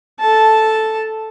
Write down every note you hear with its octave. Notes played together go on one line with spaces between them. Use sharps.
A4 A5